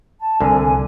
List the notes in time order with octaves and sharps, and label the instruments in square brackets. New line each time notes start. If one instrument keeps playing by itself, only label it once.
[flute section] A5
[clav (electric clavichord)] C2 D3 [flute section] G#5